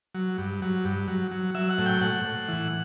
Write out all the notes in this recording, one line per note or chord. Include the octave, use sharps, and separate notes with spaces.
F#3
G2
F#3
G2
F#3
F#3
F#3 E5
F#5
A2
G5
A2 F#5
A2
E3